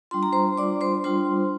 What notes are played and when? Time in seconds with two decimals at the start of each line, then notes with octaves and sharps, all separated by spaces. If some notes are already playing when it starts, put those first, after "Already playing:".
0.11 G3 D4 F4 C6
0.23 A#5
0.33 C5 C6
0.57 G3 D4 F4 D5 D6
0.81 C5 C6
1.04 G3 D4 F4 C5 C6